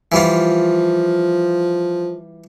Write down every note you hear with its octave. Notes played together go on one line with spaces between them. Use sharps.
E3 F3 G3 F4